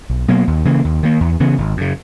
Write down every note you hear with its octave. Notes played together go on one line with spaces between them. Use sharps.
B1
B2 F#3 A#3
D#2
C#3 E3 A#3
D#2
D#3 A#3
E2
C#3 E3 B3
G#1
F#2 C#3